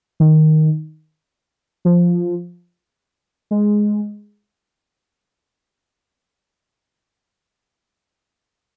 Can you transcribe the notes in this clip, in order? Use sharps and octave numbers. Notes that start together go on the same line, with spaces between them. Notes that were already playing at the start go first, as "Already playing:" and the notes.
D#3
F3
G#3